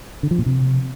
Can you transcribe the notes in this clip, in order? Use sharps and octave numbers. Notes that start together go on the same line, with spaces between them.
D3
F3
A#2
C3